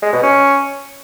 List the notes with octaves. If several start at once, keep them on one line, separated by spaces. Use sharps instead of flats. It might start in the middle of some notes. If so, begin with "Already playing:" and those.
G#3
B2
C#4